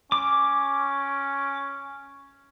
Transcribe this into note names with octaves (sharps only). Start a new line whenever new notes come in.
C#4 D6